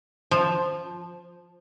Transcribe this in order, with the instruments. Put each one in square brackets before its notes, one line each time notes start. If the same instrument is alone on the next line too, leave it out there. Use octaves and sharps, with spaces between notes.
[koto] F3